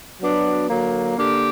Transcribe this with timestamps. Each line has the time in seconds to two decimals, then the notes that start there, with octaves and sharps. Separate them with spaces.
0.21 F#3 B3 D4 F#4
0.70 D3 F#3 A#3
1.18 D3 A#3 D4 G4